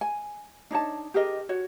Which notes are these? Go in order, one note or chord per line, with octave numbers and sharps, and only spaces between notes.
G#5
D4 D#4 C#5 A5
G4 G#4 A#4 D#5
F#4 C#5